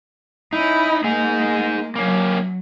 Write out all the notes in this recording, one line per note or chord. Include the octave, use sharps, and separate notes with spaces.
C#4 D#4 E4
G#3 A#3 D#4 G#4
F#3 A#3 C#4